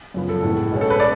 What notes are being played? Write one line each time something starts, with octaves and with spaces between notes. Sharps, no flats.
F#2 C#3 F3 B3
A4
A2 G#3 B3
B2 G#3 C#4
A4
B4
D5